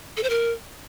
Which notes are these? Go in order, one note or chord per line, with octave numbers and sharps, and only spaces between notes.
A4
C5
A#4